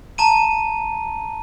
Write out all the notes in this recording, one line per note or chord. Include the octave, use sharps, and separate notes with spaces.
A5 A#5 D#7